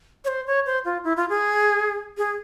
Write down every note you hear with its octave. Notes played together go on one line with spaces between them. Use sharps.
C#5
C5
C#5
C5
F4
E4
F4
G#4
G#4